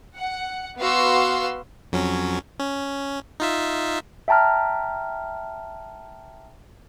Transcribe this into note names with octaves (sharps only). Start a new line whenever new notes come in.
F#5
B3 F#4 F5 C6 E6
F2 F#3 C#4
C#4
D#4 F4 E5
E5 G5 A5 A#5 F6